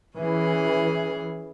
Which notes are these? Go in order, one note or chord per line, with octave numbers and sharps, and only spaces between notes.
E3 C#4 G#4